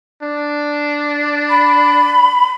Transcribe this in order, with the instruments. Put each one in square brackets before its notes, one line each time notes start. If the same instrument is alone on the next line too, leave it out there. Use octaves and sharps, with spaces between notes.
[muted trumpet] D4
[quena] B5